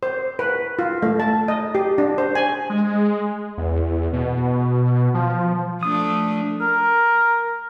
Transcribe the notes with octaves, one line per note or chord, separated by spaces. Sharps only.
C5
B4
F4
A3
A5
D#5
G4
D4
C5
G#5
G#3
E2
B2
F3
F3 A3 D4 D#6
A#4